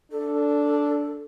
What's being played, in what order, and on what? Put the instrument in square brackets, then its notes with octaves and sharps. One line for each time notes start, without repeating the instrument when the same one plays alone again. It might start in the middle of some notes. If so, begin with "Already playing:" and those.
[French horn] D4 [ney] A4